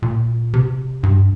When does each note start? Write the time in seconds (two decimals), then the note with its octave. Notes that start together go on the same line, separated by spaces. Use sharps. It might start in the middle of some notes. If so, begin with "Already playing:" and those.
0.02 A#2
0.53 C3
1.03 G2